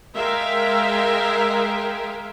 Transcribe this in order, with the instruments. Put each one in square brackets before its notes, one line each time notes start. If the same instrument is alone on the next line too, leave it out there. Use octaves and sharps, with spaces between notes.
[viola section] G#3 A#4 E5 F5 G5